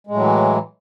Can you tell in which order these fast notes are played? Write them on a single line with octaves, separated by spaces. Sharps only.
G#3 A2 F#3 E3